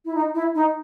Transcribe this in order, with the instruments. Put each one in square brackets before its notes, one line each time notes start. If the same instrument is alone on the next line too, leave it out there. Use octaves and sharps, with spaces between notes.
[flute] E4
D#4
E4
D#4